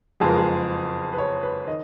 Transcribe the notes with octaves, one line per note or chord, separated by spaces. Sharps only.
F#1 F2 F3 G#3 B3 G#4
A#4
G#4
B4
C#5
B4
D#3 D#5